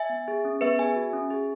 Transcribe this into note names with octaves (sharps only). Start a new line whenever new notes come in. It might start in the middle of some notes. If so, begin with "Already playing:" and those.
Already playing: E5 G#5
B3
G#4
C#4
B3 B4 E5
G#4 E5 G#5
F#4
C#4
G#4